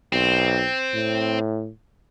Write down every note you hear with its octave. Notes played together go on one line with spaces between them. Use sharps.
B1 C4
A2